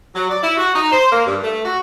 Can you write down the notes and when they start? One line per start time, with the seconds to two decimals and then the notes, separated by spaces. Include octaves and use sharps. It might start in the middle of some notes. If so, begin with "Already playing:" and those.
0.14 F#3
0.29 D5
0.42 E4
0.57 F#4
0.74 D#4
0.92 C5
1.11 A#3
1.25 G2
1.43 A3
1.64 F#4